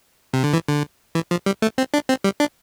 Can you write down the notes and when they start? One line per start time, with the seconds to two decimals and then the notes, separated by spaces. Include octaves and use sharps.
0.33 C3
0.44 D3
0.53 E3
0.68 D3
1.15 E3
1.31 F3
1.46 G3
1.62 A3
1.78 C4
1.94 D4
2.09 C4
2.24 G3
2.40 D4